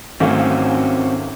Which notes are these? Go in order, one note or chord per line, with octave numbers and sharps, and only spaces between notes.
G#1 A3 C4 C#4 F#4 F5